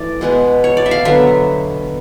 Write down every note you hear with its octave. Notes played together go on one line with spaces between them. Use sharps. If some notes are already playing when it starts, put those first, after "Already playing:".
Already playing: E3 A3 D5
B2 G#3 B3
C#5
D5
E5
F5
D3 F#3 B3 E5